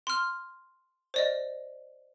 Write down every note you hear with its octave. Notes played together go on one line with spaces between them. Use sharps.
C6 F6
C5 D5 D#5